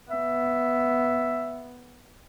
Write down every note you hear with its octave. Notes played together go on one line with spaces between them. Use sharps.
B3 E5